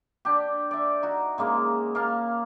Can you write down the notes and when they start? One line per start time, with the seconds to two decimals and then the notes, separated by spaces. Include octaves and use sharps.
0.25 D4 G4
0.71 D5 E5
1.03 D#4 F#4
1.38 C#3 G#3 A#3 D#4
1.95 A#3 F5 A5